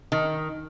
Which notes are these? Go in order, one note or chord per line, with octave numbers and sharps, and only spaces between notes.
D#3